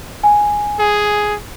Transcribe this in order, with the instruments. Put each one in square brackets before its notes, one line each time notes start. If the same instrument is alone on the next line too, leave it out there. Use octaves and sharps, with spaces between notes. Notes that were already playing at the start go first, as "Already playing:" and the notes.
[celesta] G#5
[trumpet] G#4